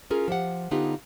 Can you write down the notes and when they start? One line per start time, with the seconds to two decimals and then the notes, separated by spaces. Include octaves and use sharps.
0.10 C#4 F4 G#4 A#4
0.28 F3 G4 F#5
0.71 D3 B3 D#4 F4 G4 B4